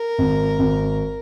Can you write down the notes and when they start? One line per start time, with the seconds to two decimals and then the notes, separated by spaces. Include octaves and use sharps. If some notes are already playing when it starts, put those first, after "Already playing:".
Already playing: A#4
0.18 G#1
0.59 G#1